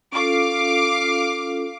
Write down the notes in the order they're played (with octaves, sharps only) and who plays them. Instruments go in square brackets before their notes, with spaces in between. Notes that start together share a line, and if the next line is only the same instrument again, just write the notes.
[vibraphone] C#4 F4 A4 [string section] F5 D6